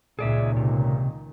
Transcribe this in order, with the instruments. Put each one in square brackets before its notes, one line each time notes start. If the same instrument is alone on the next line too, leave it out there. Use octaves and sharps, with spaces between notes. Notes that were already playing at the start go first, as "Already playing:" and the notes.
[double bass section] C#2 A#2 D#3 [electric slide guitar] G#4 D5 E5
[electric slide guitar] C3